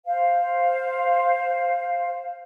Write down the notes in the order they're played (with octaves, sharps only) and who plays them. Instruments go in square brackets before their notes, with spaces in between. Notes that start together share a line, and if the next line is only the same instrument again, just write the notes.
[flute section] C5 F5